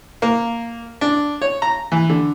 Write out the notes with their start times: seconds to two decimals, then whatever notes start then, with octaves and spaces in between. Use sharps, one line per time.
0.22 A#3
1.01 D4
1.42 C#5
1.62 A#5
1.92 E3
2.10 D3